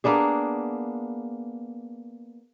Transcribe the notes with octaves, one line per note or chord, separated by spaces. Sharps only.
A#3 B3 D4 G#4